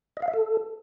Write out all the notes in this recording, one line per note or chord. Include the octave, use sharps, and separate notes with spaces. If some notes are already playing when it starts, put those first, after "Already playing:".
D#5
F5
E5
A4